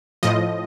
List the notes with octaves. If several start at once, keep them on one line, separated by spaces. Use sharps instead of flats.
A2 F3 D#5